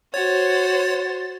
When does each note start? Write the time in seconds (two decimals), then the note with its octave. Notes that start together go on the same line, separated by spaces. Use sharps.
0.14 F#4 C5 C#5 A6